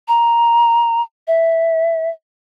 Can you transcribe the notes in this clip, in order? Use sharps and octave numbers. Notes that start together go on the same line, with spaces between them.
A#5
E5